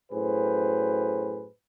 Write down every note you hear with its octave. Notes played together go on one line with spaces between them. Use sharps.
F#2 A2 G#4 B4 C5